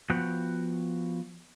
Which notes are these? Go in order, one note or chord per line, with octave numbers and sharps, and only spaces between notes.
F3 B3 F#4 F#5 G5